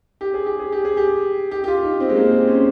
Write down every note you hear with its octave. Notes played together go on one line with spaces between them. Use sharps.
G4
G#4
G4
G#4
G4
G#4
G4
G4
G4
F4
D#4
C4
G#3
A#3
C4
C#4